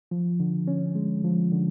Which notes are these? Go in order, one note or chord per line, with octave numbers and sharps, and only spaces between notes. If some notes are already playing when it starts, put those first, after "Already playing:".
F3
D3
C#4
G#3
F3
D3